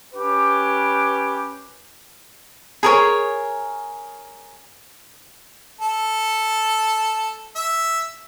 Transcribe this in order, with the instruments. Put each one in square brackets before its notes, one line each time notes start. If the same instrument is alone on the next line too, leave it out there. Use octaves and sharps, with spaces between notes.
[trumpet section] C#4 G4 B4
[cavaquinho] G#4 A#4 C#5
[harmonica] A4
E5